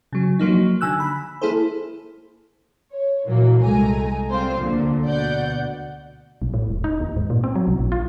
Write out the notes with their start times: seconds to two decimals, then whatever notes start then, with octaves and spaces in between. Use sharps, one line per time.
0.13 C#3 F#3
0.39 F3 F#3 A#3 D#4
0.81 D3 G#5 E6 F#6
1.00 B5
1.42 A#3 E4 G#4 A4 C5
2.92 C#5
3.26 A#2 E3 F#3 A#3
3.61 C2 G#3 A3 G#5 A#5
4.30 G3 C4 F4 C5
4.59 D2 A#2 D3
5.04 D2 B2 D5 F#5 G6
6.42 B1
6.54 A2
6.69 E1
6.84 D#4
7.00 D#2
7.16 G#2
7.30 A#2
7.44 C4
7.55 F#3
7.67 C2
7.79 A#1
7.92 F4